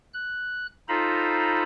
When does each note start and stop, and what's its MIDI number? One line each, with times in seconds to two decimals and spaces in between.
0.14 0.67 90
0.89 1.63 63
0.89 1.63 65
0.89 1.63 69
0.89 1.63 72
0.89 1.63 82
0.89 1.63 83